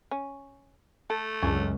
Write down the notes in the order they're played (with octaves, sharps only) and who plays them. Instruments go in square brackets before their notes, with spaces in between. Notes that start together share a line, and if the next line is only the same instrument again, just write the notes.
[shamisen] C#4
[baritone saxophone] A3 [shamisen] A4
[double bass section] C#2 [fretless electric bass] F#2 [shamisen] C#4 D4 A4